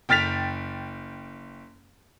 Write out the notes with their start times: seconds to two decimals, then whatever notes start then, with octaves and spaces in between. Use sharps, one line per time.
0.09 F#1 G5 F6 A6 B6 F7